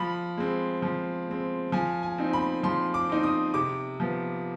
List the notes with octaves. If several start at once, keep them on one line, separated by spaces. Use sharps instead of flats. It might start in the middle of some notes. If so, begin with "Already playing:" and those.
Already playing: F3 B5
G#3 C4
F3
G#3 C4
F3 G#5
G#5
C4 D#4
B5
F3 C6
D6
C4 D#4
D#6
C3 D6
F3 B3